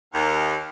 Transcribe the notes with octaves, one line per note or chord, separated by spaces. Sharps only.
D#2